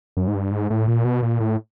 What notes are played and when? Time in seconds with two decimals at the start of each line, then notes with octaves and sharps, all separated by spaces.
0.17 F#2
0.28 G#2
0.35 G2
0.51 G#2
0.70 A2
0.88 A#2
1.05 B2
1.23 A#2
1.40 A2